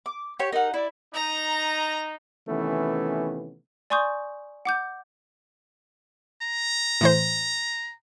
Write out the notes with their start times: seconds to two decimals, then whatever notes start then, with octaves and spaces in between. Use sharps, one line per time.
0.06 D6
0.39 G4 C#5
0.52 D#4 A#4 F#5
0.74 E4 D5
1.14 D#4 A#5
2.48 C3 D#3 E3 A3 B3 C#4
3.90 D5 G#5 C6 C#6 D#6 G6
4.65 F#5 D6 G6
6.42 A#5
7.01 A2 E3 C5